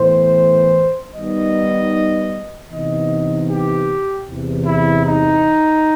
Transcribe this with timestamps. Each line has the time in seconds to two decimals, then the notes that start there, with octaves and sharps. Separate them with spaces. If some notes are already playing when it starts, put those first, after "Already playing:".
Already playing: A2 E3 B3 C5
1.15 D#3 G3 B3 D#4 D#5
2.70 C3 E3 B3 D#4 D#5
3.48 G4
4.26 E2 C3 E3
4.65 E4
5.05 D#4